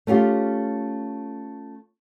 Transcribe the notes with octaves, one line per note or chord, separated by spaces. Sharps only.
A3 C#4 F4 G4